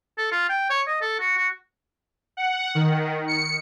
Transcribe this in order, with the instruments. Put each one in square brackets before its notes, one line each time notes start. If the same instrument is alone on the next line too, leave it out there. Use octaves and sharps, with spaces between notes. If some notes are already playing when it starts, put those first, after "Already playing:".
[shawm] A4
F4
G5
C#5
D#5
A4
F#4
F#4
[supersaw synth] F#5
D#3
C#7